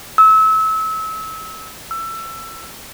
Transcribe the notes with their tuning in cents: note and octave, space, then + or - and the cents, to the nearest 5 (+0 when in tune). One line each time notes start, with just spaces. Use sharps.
E6 -30
E6 +20